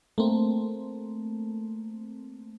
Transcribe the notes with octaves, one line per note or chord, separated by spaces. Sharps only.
A3 A#3 C4